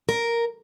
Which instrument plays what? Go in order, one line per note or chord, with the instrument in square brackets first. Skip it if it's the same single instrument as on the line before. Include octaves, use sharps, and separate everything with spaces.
[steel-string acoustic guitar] A#4